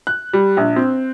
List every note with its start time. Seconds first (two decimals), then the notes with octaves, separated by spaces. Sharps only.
0.07 F#6
0.33 G3
0.57 A#1
0.76 C4